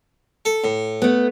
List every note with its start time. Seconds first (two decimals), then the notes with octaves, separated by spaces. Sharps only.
0.45 A4
0.64 A2
1.02 A3 B3